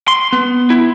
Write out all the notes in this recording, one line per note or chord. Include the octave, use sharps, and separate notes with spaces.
C6
B3
E4